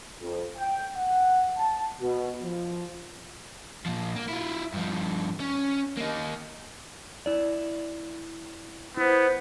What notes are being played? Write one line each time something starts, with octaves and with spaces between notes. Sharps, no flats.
F2
G5
F#5
A5
B2
F3
A#2 F3
A#3
E4 F4
G2 F3
C#4
A#3 D#4
E4 D5
B3 E4 C5